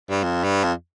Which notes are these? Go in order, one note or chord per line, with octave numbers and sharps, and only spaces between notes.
G2
F2
G2
F2